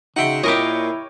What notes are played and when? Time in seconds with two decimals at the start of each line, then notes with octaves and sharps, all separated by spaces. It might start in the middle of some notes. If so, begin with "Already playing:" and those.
0.16 C#3 D#4 F#4 E5 F#5 G5 C6
0.43 A#2 E4 G4 A#4 C#5 D#5